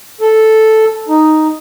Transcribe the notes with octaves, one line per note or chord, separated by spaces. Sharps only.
A4
D#4